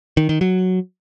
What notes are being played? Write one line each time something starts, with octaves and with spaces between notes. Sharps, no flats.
D#3
D#3
F#3